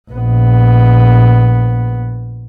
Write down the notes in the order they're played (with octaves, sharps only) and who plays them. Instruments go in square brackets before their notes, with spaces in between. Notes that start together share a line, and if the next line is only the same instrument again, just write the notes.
[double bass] A#1 B3